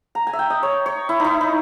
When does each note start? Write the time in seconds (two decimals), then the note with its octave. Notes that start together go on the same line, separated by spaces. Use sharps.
0.15 A#5
0.27 G#5
0.33 E5
0.39 G5
0.50 D#5
0.63 C#5
0.86 C#5
1.09 E4
1.20 D#4 E4
1.41 D#4